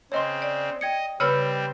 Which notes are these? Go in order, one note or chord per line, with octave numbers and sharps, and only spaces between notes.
C#3 C4 C#5 D#5 C6
D5
D#5 G5 G#6 C#7
C#3 G3 C4 B4 C#5 B5 E6 F6